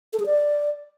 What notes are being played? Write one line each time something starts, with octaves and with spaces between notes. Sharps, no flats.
A4
G#4
D5